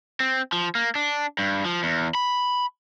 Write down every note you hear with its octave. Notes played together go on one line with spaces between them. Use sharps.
C4
F3
A#3
D4
G2
F3
E2
B5